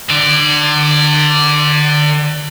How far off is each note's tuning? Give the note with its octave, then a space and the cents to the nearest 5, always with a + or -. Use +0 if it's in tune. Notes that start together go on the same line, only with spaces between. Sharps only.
D3 +35 D5 +0